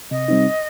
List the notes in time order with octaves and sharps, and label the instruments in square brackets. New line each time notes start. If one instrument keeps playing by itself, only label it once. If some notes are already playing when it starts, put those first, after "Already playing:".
[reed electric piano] C3 [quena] D#5
[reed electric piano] G3 C4 D#4